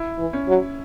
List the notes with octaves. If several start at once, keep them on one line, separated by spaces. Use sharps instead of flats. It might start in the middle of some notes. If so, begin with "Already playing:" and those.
Already playing: E4
E3
C#4
F#3